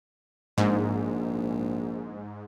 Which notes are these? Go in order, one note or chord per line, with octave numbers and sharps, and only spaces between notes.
A#1 G#2